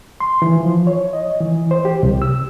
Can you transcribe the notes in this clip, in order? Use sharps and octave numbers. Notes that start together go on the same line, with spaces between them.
C6
E3
F3
C#5
D#5
E3
C5
G4
C2
E6